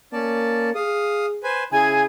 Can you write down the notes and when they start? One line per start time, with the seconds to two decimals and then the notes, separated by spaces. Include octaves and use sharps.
0.13 A#3 C#4 D5 A5
0.75 G#4 F5 D#6
1.43 B4 C5 G#5
1.72 C#3 E4 G#4 G#5